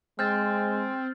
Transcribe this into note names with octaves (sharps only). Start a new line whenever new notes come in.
G#3 C4 F6 G6 A6